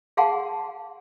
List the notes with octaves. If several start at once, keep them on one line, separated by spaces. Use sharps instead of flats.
G#4 F5 F#5 A5 C6